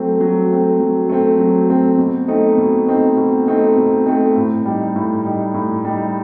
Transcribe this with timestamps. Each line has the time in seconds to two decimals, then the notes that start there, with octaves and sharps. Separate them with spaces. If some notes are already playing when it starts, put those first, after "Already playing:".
Already playing: F#3 A3 C4
0.20 F#3
0.50 A3 C4
0.80 F#3
1.09 A3 C4
1.39 F#3
1.69 A3 C4
1.98 B2
2.28 A3 C4 D#4
2.58 B2
2.88 A3 C4 D#4
3.17 B2
3.47 A3 C4 D#4
3.77 B2
4.06 A3 C4 D#4
4.36 A2
4.65 G3 D#4
4.96 A2
5.25 G3 D#4
5.54 A2
5.85 G3 D#4